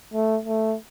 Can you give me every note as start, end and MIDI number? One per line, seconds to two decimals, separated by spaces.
0.13 0.38 57
0.45 0.75 57